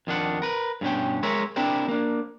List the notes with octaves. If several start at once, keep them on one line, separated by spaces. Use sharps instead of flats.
F2 D#3 D4 F#5
A#4 B4
G2 B2 C#4 G5
G#3 A#4 C#5 E5
C4 D4 E4 G4 A#4
A#3 D4